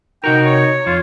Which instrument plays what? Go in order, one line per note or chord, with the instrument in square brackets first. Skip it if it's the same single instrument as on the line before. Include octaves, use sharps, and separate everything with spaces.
[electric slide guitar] C3 F#4 A#4 [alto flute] D#4 [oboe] G5
[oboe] C#5
[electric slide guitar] F2 F3 [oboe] F4 [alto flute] C#5